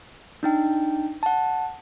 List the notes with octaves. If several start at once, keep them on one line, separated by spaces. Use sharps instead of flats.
D4 D#4 G5
F#5 A5